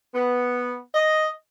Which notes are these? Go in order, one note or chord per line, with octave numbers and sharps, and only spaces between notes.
B3
D#5